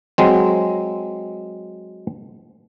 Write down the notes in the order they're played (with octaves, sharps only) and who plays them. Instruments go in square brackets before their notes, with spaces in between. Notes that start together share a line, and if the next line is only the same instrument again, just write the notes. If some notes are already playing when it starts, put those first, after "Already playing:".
[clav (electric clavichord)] F#3 G#3 C4